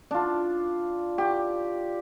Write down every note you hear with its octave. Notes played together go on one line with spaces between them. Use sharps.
D4 F4
G4